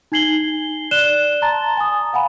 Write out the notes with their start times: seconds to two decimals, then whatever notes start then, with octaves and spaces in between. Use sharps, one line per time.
0.12 D#4 G#5 G#6 C7 F#7 G7
0.91 D5 F#6 E7 G7
1.42 A5 A#5 C6 A6
1.77 G#5 D#6
2.13 F5 F#5 G#5 B5